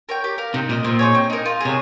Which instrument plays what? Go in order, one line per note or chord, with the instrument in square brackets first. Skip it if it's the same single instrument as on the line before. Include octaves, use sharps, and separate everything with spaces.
[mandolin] A#4 C#5 G5
G4
A#4 F5
[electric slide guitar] C3 [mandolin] D#4
[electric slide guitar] A#2 [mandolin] A#4 D#5
[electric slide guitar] A#2 [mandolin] C4
[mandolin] D#4 G#4 C#5
C4
D#4 A#4
F4
[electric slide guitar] C3 [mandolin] G#4 C#5